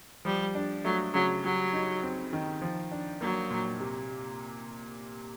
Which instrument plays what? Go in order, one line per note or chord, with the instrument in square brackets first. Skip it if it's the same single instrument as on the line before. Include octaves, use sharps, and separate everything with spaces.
[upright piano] F3 [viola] G3
[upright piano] D4
[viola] F#3 [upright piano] A3
[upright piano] C#3 [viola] F#3
[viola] F#3 [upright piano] G3
[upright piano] D#4
C4
D#3
F3
D4
[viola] F#3 [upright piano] A#3
[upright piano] A#2
C3